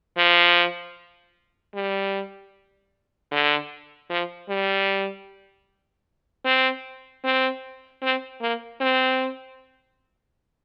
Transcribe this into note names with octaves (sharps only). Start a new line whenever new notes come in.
F3
G3
D3
F3
G3
C4
C4
C4
A#3
C4